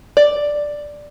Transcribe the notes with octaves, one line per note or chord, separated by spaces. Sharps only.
D5